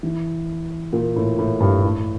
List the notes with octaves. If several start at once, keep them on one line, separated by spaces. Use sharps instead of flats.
E3
A#2
A2
A2
G2
A2